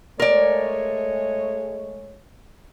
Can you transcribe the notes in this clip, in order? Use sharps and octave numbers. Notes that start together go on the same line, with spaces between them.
G#3 A3 A#4 C#5 D5